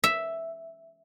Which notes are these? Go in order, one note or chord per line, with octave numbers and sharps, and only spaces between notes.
E5